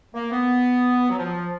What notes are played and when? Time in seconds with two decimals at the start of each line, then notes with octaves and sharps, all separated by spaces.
0.14 A#3
0.31 B3
1.10 F#3
1.17 F3